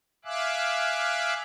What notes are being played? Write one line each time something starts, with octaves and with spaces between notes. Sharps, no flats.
E5 F5 G#5 D6 E6 F#6